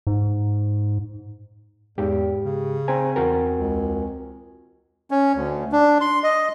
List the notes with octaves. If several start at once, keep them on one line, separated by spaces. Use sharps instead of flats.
G#2
E2 G#2 G4
C#3
C4 C5 G#5 A#5
E2 F#4 A#4
C#2
C#4
D2
D4
C6
D#5